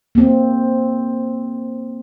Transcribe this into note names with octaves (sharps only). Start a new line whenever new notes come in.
A#3 C4